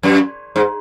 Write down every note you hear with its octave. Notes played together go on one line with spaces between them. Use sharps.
F#2
G#2